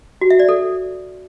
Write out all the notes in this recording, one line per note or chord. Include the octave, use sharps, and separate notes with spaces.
F#4
E5
D5
A4